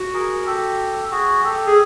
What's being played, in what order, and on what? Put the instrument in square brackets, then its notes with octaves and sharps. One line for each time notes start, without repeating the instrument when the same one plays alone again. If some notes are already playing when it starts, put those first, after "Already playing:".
Already playing: [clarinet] F#4
[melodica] G#4 A#4
G4 A4
F#4 G#4
G4 A4
[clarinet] G#4